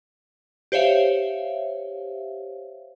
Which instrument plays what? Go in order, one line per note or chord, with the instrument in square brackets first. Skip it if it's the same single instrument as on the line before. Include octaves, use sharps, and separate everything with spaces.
[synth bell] G4 C5 C#5 E5 F5